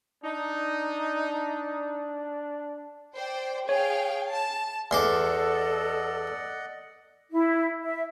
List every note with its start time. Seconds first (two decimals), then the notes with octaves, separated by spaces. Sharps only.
0.24 D4 D#4
3.16 C5 D5 G5
3.69 G#4 C#5 F5 G5
4.31 A5
4.91 E2 A4 D5 D#5 F#5 C6 D6
7.32 E4
7.83 E5